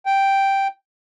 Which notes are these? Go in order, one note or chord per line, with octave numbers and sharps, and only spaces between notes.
G5